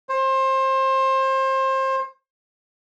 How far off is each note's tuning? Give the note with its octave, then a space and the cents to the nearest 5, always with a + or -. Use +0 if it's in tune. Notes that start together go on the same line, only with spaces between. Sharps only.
C5 +25